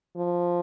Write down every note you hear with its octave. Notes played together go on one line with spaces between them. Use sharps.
F3